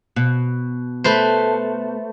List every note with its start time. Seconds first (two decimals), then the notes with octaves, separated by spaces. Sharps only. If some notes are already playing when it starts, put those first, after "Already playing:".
0.16 B2
1.04 A3 B4 C5